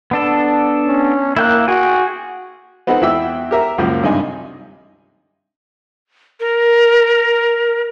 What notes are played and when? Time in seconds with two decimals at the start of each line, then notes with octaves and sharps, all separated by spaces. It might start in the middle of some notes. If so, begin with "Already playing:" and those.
0.11 B3 D4 A4
0.87 C#4
1.36 A#3 E4 G5 F#6
1.68 F#4 G#4 G5 G#5
2.87 B3 C4 D#4 F#4 A4 F#5
3.01 E2 E4 F#4 E5 G5 E6
3.51 G4 A#4 E5
3.78 C#2 F#2 F3 A#3
4.03 G2 C3 D4 D#4 G#5
6.40 A#4